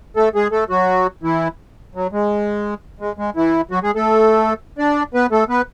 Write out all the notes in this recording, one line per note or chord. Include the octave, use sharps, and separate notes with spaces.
A3 A4
G#3 G#4
A3 A4
F#3 F#4
E3 E4
F#3
G#3
G#3
G#3
E3 E4
F#3 F#4
G#3 G#4
A3 A4
D4 D5
B3 B4
A3 A4
B3 B4